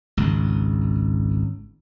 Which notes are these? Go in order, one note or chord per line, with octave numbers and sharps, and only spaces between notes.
G#1 C#2